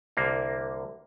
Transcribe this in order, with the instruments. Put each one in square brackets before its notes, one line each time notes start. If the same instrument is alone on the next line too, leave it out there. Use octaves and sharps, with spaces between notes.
[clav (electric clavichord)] C2 D3 A#3